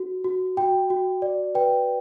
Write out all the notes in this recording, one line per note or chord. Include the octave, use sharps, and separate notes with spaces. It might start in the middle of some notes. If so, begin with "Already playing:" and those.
Already playing: F#4
F#4
F#4 G5
F#4
D5
B4 G5